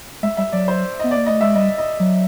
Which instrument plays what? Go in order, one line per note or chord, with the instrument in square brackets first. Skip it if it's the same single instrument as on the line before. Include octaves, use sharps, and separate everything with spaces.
[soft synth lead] G#3 [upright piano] E5
[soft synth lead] G3 [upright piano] E5
[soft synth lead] F#3 [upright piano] D5
[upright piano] C5
[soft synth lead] B3 [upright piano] D#5
[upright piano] D5
[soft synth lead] A#3
[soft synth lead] A3 [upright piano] D#5
[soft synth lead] G#3 [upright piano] E5
[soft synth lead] G3 [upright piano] D#5
[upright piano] D#5
[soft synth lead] F#3